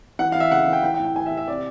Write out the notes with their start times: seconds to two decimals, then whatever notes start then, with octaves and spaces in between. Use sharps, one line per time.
0.19 E3 F#5
0.32 E3 F5
0.40 E5
0.51 C#3 F#5
0.67 E3
0.73 G5
0.83 E3 G5
0.94 G5
1.00 A2
1.05 G5
1.15 E3 G#5
1.26 E5
1.32 E3
1.37 E5
1.48 C3 D5